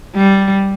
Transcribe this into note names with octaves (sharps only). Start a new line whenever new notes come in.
G3